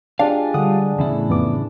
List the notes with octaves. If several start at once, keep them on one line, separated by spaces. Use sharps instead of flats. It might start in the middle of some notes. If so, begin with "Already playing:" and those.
G#3 D4 F4 G4 F5
D3 G3 F#5 D#6
E2 A2 C#3 E4
F2 B3 D6